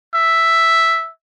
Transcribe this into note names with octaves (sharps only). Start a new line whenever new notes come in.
E5